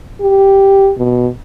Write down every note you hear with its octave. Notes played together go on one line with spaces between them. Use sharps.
G4
B2